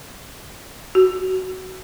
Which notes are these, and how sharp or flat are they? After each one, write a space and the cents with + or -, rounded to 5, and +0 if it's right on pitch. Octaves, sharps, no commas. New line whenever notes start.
F#4 +15